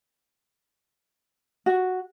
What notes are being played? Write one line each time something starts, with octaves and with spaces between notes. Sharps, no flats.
F#4